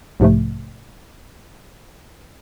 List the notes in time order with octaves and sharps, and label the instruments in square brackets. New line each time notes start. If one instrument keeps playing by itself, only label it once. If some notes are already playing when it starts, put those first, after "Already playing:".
[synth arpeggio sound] B1 G#2 C3 F3 A3